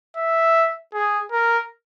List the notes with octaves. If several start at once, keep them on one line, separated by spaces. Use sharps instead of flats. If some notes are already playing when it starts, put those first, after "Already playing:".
E5
G#4
A#4